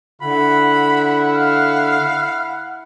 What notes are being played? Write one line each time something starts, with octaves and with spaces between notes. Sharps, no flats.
D3 E4 F#5 B5
F5